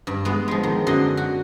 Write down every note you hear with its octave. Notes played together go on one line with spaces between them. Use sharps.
G2
G#3 B3
F3 G#3
D#3
F#2 D3 F#4 D#5 C6
F#4